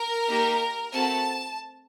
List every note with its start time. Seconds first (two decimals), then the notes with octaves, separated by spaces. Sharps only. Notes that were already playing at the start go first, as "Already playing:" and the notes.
Already playing: A#4
0.28 A#3 D#4 G4
0.93 A3 C4 F#4 A4 A5